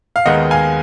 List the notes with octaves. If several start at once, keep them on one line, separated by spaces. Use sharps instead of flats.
F5
D#2 D#3 G#3 B3 D#5 F#5
F5 G#5